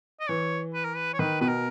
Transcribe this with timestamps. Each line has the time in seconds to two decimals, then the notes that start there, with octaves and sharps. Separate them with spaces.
0.20 D#5
0.29 E3 C#5
0.74 B4
0.85 A#4
0.96 B4
1.13 C#5
1.19 D#3 B4
1.41 B2 B4
1.49 A#4